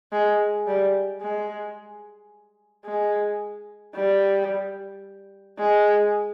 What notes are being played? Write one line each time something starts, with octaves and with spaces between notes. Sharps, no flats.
G#3
G3
G#3
G#3
G3
G#3